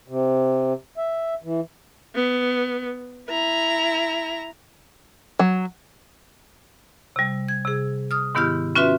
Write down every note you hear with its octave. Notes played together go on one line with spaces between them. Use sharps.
C3
E5
E3
B3
E4 A#5
F#3
C3 G3
G#6
C3 G#4
D#6 F6
G#2 D#3 B3 E4 G4 F6
C#4 F4 F#4 B4 E5 C6